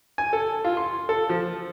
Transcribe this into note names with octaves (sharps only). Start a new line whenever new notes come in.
G#5
A4
F4
C6
A4
F3